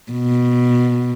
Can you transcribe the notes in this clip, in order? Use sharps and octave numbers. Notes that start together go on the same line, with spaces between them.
B2